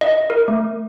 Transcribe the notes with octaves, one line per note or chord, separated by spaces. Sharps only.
D#5
A#4
A3